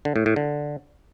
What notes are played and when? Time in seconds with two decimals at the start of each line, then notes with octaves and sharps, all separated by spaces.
0.05 D3
0.16 A2
0.26 A2
0.36 D3